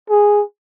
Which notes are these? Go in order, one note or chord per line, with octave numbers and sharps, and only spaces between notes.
G#4